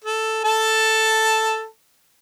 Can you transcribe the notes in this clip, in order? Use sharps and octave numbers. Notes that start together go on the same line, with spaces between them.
A4
A4 A5